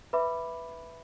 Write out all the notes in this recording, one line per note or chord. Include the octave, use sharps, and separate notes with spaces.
B4 E5 B5 D6